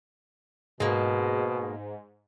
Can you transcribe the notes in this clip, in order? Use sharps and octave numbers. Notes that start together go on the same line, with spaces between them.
G#2 B2 G#3 A#3